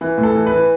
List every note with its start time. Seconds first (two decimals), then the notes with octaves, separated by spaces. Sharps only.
0.01 E3
0.18 A2
0.23 A4
0.35 E3
0.47 B4
0.52 E3